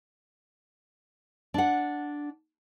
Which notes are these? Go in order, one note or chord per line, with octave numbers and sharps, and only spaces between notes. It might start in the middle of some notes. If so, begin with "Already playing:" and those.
D4 F#5